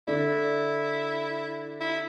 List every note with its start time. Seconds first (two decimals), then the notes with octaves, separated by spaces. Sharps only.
0.07 D3 D4 E4
1.81 E4